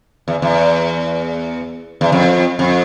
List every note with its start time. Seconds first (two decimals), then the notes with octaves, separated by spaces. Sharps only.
0.28 E2
0.42 E2
2.01 E2
2.12 F2
2.59 F2